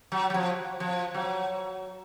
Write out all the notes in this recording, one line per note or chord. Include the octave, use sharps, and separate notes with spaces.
F#3
F#3
F3
F3
F#3